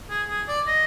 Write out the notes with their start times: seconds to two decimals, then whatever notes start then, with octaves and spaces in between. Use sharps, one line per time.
0.10 G#4
0.29 G#4
0.48 D5
0.67 D#5